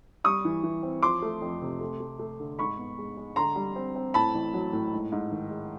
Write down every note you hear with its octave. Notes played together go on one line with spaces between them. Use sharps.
G3 C#6 D#6
E3
E3
C4
F3 C6 D6
A3
F2
C3
A3
A3
A3
D3
G#2 B5 C#6
B3
G#3
G#3
D3 A#5 C6
G3
C4
C4
A2 A5 B5
A1
F#3
A2
G#2
G#2
D#3
G#3